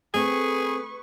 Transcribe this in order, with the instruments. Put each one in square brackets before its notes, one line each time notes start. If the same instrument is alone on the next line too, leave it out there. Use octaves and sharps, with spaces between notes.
[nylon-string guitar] A3 C4 [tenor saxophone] G#4 [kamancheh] B4 C#6